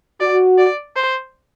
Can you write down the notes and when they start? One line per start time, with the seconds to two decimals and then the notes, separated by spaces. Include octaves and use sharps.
0.20 F#4 D5
0.58 D5
0.96 C5